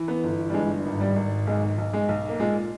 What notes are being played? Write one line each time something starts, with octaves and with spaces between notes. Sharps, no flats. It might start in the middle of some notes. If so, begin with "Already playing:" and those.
Already playing: E3
B3
G1
G3
G2 G#3
G#1
G3
G#1
B1 G#3
B1
G#3
B1
A#3
A#2 G#3